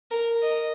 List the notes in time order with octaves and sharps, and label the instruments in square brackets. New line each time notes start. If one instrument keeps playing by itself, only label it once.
[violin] A#4
D#5